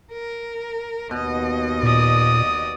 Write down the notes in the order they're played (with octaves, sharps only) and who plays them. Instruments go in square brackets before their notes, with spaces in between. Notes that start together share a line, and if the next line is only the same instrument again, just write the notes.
[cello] A#4
[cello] D#2 D#5 [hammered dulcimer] B2
[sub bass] A#2 [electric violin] D5 D#6